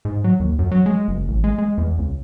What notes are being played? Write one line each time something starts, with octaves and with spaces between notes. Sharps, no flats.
G#2
F#3
D#2
F#2
F#3
G#3
F#1
A1
G#3
G#3
E2
C#2